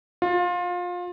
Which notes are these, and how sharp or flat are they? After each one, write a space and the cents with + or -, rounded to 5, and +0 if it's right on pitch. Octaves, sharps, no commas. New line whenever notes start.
F4 +25